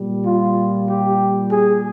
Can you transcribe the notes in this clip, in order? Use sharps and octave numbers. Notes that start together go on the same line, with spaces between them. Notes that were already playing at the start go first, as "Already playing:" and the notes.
Already playing: A#2 G3
F4
G4
G#4